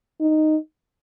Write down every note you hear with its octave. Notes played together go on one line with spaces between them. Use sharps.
D#4